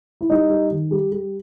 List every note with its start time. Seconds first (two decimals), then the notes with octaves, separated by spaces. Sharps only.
0.21 E4
0.30 G3 D#4
0.50 G3
0.70 D#3
0.91 G3
1.12 G3